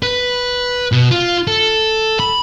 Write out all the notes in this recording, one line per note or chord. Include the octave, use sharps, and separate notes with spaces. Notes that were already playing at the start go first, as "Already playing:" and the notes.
B4
B2
F4
A4
B5